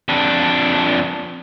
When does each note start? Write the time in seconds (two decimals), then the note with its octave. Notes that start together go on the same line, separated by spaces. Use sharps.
0.09 F2 D4